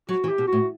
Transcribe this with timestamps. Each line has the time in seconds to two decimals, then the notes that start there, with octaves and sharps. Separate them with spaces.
0.09 F#3 F#4
0.24 E3
0.29 G4
0.38 B2
0.48 A2 F#4